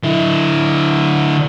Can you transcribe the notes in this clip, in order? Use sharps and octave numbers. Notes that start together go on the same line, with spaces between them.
D3 E4